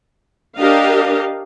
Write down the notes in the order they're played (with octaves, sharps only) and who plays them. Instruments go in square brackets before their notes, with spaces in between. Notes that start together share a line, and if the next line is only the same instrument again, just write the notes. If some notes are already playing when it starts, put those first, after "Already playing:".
[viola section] D4 G4 A#4 D#5 F5